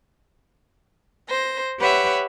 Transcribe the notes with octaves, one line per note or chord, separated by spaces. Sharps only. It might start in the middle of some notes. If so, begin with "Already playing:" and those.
C5 A#6
G4 B4 C#5 E5 F#5